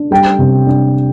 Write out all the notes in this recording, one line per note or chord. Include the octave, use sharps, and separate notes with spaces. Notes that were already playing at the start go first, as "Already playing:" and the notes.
Already playing: D4
G3 G5
C3
D4